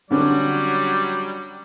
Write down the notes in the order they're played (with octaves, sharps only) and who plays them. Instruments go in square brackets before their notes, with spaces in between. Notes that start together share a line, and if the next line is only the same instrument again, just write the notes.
[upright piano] D3 C#4 [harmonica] F#3 G3 D5